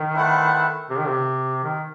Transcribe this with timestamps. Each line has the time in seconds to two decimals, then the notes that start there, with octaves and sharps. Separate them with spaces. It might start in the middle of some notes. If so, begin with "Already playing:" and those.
Already playing: D#3
0.15 A3 C4 E4 B4 F#5
0.90 C3
0.99 D#3
1.08 C3
1.64 D#3